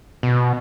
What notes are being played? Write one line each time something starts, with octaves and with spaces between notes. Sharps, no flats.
B2